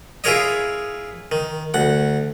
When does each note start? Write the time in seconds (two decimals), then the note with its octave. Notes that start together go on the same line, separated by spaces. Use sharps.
0.24 E4 F4 G#4 A#4 C#5 D#5
1.32 D#3
1.74 D2 F#5